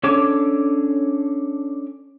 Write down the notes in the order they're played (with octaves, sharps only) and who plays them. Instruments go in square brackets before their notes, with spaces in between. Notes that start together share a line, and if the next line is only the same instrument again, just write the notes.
[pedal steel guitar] C#4 D4 A4 C#5 D6